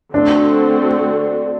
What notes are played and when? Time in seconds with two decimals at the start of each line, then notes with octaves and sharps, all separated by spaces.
0.14 D3 A3 C4 D4 F#4